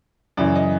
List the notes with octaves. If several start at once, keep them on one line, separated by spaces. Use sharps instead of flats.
F#2 C#3 E3 D5
D#5